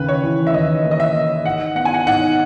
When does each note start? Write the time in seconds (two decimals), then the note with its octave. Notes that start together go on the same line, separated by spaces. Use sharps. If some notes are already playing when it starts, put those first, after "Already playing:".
Already playing: D#2 C#3 B4
0.09 C#5
0.24 E3
0.47 E5
0.54 D#2 D#5
0.85 A#3
0.91 D#5
1.00 E5
1.15 A#3
1.45 G#2 F#5
1.75 B3 F#5
1.85 G#5
1.94 F#5
2.06 G#2 F#5